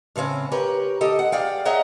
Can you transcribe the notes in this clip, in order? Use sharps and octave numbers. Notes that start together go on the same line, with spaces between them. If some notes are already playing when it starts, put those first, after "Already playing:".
A2 C#3 C4 C#4
G4 A#4 B4 C#5
D2 G4 A4 D#5
F#5
G#4 D5 F5 G5
G#4 C#5 D#5 E5 F#5 A#5